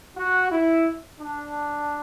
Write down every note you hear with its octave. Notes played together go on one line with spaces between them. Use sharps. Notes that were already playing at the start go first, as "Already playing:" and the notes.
F#4
E4
D4